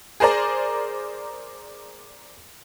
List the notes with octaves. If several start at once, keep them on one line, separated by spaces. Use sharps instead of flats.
G#4 A#4 C5 D5 A#5